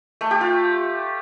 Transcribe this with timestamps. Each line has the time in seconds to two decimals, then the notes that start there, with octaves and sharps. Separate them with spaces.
0.21 A3
0.31 G4
0.41 F4